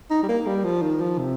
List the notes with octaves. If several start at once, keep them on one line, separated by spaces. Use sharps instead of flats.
D#4
G3
A#3
G3
F3
D#3
F3
C3